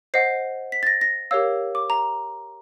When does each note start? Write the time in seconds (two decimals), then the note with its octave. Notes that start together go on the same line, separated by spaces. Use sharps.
0.14 C5 D#5 F#5 C7
0.72 B6
0.83 A6
0.87 A#6
1.01 A#6
1.31 G4 A#4 C#5 F5 E6
1.75 D6
1.90 A#5